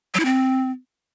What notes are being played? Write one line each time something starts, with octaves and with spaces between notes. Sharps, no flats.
F#3
E4
C4